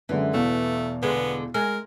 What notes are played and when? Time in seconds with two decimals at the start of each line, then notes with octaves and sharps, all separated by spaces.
0.09 F#2 D3 E3 G#3
0.34 E2 B2 A3 F5
1.03 D3 G#3 B3
1.54 G#3 A#4